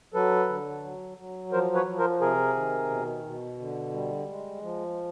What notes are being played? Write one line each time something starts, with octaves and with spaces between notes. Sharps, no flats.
F#3 A4 B4
D3
F#3
F#3
F3 A#4 C5
B4 C#5
F3
A#4 C5
C3 G#4 A#4
D#3
B2
B2
D3
G3
G#3
F3